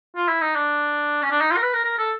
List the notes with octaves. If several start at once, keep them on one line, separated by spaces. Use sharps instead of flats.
F4
E4
D#4
D4
C#4
D4
D#4
F4
A#4
B4
A#4
A#4
A4